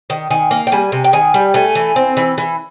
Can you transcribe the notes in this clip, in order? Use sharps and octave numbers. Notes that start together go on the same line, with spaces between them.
D#3
D#3 G#5
A#3
G5
G3 G#5
C3
G5
D#3 G#5
G3
A3 G#5
E3
C4
E3
E3